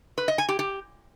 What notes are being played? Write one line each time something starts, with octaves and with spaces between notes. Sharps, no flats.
B4
D#5
G#5
G4
G4